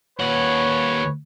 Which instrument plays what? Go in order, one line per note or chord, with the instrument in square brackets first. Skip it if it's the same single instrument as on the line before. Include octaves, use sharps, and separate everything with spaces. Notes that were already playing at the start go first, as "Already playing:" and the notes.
[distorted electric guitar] D#2 F#5 [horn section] B4 C#5